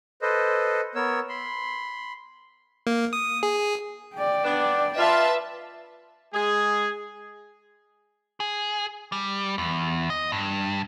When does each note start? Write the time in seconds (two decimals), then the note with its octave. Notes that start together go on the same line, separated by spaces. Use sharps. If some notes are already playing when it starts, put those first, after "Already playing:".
0.22 A4 B4 C5 D#5
0.95 B3 A#4 C#5 E6
1.29 B5 C6
2.87 A#3
3.13 D#6
3.43 G#4
4.16 D5 G5
4.44 B3 D4
4.98 F4 B4 E5 A5
6.34 G#3 G#4
8.40 G#4
9.12 G3
9.58 E2
10.10 D#5
10.32 G2